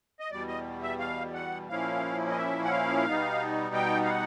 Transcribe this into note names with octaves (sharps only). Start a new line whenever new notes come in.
D#5
E2 B2 G3 D5
D#5
E5
F5
F#5
A#2 F3 A#3 C#4 E4 F5
D#5
E5
F#5
F5
B2 G3 B3 D#4
G5
F5
F#5